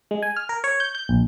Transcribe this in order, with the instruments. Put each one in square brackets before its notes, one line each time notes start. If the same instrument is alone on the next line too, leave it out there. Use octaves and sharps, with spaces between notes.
[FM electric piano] G#3
G#5
F6
A#4
C#5
G6
G6
A#1